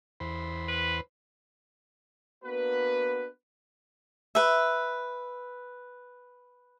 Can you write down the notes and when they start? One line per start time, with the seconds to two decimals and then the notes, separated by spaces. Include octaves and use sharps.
0.20 E2 C5 B5
0.68 B4
2.44 A#3 B3 D4 F#4 B4
4.35 B4 E5